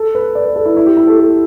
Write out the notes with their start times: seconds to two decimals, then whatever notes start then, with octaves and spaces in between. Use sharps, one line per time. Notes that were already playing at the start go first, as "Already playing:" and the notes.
Already playing: A4
0.15 B4
0.35 D5
0.45 B4
0.56 A4
0.66 E4
0.77 E4
0.86 G4
0.97 E4
1.07 A4
1.18 A4